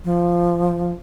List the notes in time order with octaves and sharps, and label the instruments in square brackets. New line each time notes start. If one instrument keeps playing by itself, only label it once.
[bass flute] F3